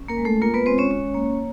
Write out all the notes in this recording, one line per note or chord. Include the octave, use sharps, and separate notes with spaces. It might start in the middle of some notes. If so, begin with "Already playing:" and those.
Already playing: C#4
A#3 A#4
G#3
A3 A4
A#3 F4 A#4
B3 B4
G#3 C4 C5
C#4 C#5
C#4
A#3